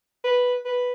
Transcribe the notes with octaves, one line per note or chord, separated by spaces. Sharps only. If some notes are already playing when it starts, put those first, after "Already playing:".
B4
B4